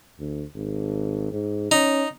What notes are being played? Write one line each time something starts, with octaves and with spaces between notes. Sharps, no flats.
D2
G#1
G#2
C#4 D#4